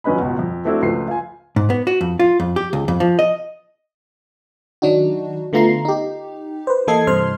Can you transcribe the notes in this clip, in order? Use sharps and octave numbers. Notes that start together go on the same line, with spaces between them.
F2 F#3 C#4 B4 D#5 B5
C#2 B2
F2
A3 C4 D4 E4 F#4
C#2 F3 A3 B4 C7
F4 G#5
G#2
B3
F#4
F2
F4
F2
G4
C#2
F2
F3
D#5
D#3 F#3 D4 D#4 F#4
D3 A3 B3 F4 A#5 C7
D#4 G4
B4 C5
E3 A#3 A4 D#5 G#6 C7
G2 C3 C5 C6 F6